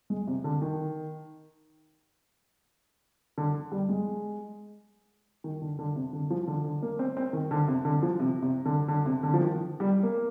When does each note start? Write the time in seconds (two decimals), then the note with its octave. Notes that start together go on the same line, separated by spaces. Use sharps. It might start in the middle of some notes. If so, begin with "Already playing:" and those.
0.10 G#3
0.27 C3
0.44 D3
0.62 D#3
3.38 D3
3.72 G3
3.89 G#3
5.44 D#3
5.62 D3
5.79 D3
5.96 C3
6.13 D3
6.30 F3
6.47 D3
6.64 D3
6.82 A#3
6.99 C4
7.17 C4
7.33 D#3
7.51 D3
7.68 C3
7.85 D3
8.03 F3
8.20 C3
8.42 C3
8.65 D3
8.88 D3
9.06 C3
9.23 D3
9.34 F3
9.41 D#3
9.80 G3
10.03 A#3